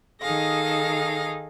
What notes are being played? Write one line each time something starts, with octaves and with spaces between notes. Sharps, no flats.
D#3 D#4 G#4 A4 F5 A#6